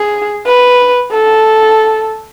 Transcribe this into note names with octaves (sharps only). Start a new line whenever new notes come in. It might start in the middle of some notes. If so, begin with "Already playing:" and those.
Already playing: G#4
B4
A4